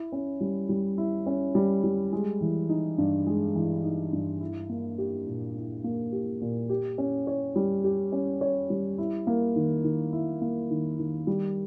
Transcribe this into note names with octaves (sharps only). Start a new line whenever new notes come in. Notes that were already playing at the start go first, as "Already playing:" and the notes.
Already playing: E4
C#4
G3
G3
E4
C#4
G3
G3
G#3
E3
D#4
G2
G#3
E3
D#4
G2
E4
A#3
G4
A#2
E4
A#3
G4
A#2
G4
C#4
C#5
G3
G4
C#4
C#5
G3
E4
A#3
D#3
D#3
E4
A#3
D#3
D#3
G3